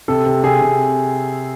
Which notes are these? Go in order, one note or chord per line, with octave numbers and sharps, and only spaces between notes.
C3 A4
C3
C3 G#4
C3